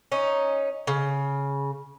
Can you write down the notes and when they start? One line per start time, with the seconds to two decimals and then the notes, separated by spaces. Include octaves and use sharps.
0.12 C#4 D#4
0.87 C#3